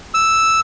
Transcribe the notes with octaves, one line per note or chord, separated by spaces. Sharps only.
E6